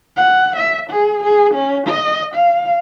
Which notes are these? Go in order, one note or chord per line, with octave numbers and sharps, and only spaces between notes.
F#5
E5
G#4
G#4
C#4
D#5
F5